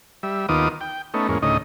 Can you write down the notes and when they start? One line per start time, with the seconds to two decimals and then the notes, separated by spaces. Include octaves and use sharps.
0.23 G3 E5
0.49 D#2 D#3 B3 F4 D6 D#6
0.81 G5
1.14 A3 B3 C#4 D#4
1.28 E2 G#2 A#3 C#4
1.42 D2 A2 C#3 D#4 D#5